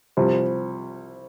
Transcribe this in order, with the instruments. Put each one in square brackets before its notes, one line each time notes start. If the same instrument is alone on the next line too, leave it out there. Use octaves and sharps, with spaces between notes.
[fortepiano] C2 C3 F3